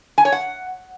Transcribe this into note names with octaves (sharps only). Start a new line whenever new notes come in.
G#5
C#5
F#5